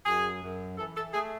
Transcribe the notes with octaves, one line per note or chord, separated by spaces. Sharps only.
F#2 G#4
F#2
E3 A4
A4
A3 G#4